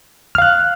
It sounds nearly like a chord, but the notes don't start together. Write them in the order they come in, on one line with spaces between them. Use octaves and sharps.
F6 F5 F#6